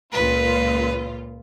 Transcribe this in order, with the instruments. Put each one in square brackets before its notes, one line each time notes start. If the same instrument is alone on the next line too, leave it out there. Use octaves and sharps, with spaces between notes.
[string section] C#2 A#2 F4 [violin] B4